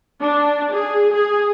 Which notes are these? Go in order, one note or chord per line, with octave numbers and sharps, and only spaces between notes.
D4
G#4
G#4